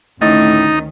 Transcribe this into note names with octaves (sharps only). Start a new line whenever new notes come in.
D2 A2 D#3 C#4 D#4 D#5 A6